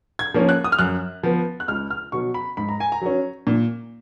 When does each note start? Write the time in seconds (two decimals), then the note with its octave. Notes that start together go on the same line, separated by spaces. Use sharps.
0.19 G#6
0.34 F3 A#3 C#4
0.49 F#6
0.64 D#6
0.72 F6
0.78 F#2 F#6
1.23 F3 B3
1.60 F#6
1.68 C#2 F6
1.90 F6
2.12 B2 F#3 C#6
2.34 B5
2.57 G#2 B5
2.68 A#5
2.80 G#5
2.92 A#5
3.02 F#3 C#4
3.47 A#2